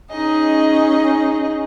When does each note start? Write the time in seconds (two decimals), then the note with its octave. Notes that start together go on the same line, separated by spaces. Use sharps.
0.11 C#4 D#4 G#4 D#5